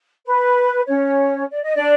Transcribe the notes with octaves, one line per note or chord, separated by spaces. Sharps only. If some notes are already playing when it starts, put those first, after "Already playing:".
B4
C#4 C#5
D5
D#5
D4 D5